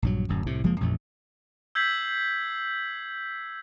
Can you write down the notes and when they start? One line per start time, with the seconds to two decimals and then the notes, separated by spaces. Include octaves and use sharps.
0.02 A#1 G2 F#3
0.28 D1 F#2
0.46 C2 A2 C3
0.63 F#1 F3 G#3 A#3
0.81 A1 F2 A#2 A3
1.75 E6 G6 G#6 B6 C7 F#7